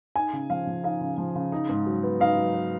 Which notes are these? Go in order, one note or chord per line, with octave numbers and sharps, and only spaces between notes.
D#4 G#5
C#3
F3 F5
F3
D#4 F5
C#3
F3
C#3
D#4
G#2
F#3
B3
D#4 F5
F#3
B3